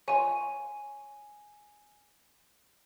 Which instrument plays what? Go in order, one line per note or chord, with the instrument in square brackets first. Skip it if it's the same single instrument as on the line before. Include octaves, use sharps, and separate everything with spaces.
[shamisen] F4 C#5 [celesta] G#5 D#7